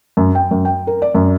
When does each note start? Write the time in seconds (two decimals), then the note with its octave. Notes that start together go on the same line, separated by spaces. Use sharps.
0.17 F#2
0.35 G5
0.51 F#2
0.65 G5
0.87 A#4
1.02 D5
1.15 F#2